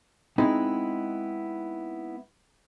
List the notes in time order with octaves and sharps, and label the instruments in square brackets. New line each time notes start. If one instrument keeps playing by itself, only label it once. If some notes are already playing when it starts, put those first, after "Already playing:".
[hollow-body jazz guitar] G#3 B3 C4 D#4 E4 G#4